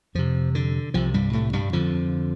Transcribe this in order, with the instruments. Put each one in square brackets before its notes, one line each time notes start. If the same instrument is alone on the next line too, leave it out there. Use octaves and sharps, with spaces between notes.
[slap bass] F2 C3 F3
D3
C2 C3 F3
G2 G3
A2 A3
G2 G3
F2 D3 F3